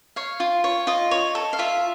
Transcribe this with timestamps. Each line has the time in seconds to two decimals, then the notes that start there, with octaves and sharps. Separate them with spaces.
0.16 C#5 F5
0.40 F4
0.64 C#5
0.87 F4 D#5
1.11 C#5
1.35 A4
1.53 F5
1.59 F4 E5